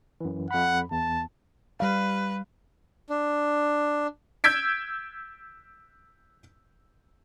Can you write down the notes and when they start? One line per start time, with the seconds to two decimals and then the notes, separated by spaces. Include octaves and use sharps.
0.21 F#2 E3
0.51 F2 F#5 B5
0.91 E2 A5
1.80 G3 B4 F5
3.10 D4
4.44 E6 G6 G#6 B6 D7